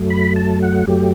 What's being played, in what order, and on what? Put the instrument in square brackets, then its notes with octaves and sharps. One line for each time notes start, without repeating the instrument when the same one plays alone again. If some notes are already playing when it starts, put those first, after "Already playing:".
Already playing: [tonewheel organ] F#2 F#3 A3
B5
A5
F#5
F#2 F#3 A3 G4